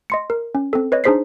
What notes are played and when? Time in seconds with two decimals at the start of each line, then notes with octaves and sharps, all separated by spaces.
0.10 D#5 C6 C#7
0.30 A#4
0.55 C#4
0.73 C4 A4
0.92 B4 C#5 D#5
1.04 D4 D#4 G#4 C5 B6 C7